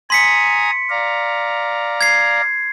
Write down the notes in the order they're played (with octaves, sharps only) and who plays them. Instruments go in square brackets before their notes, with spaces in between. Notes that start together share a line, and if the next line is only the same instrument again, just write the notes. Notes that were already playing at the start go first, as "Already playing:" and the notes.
[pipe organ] G#5 A#5 D#6 [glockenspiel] C6 B6 C#7
[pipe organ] D5 F5 A#5
[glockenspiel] G#6 C7